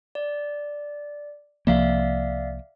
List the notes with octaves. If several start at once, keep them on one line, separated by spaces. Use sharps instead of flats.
D5
C2 F3 A#3 D5 E5 F5